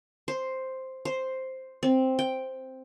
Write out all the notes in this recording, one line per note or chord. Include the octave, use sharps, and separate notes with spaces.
C5
C5
C4
G5